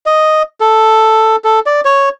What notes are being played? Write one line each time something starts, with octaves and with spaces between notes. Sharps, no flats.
D#5
A4
A4
D5
C#5